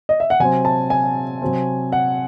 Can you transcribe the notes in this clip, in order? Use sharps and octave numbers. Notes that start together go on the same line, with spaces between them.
D#5
E5
F#5
C3 F#3 C4 G#5
A5
G#5
C3 F#3 C4
F#5